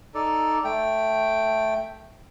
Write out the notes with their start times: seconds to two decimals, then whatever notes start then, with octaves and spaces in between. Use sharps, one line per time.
0.14 D#4 A4 D5
0.64 A3 G5